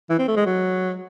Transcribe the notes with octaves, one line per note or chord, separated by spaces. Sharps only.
E3
C4
A3
G#3
F#3